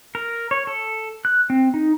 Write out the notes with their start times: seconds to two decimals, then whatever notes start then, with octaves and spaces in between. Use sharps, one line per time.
0.15 A#4
0.51 C#5
0.67 A4
1.25 F#6
1.50 C4
1.74 D#4